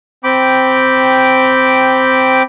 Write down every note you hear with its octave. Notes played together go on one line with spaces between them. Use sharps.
C4 G5 B5 D6